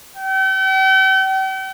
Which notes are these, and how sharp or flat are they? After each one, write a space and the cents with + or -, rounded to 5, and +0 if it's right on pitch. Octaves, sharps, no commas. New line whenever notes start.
G5 -45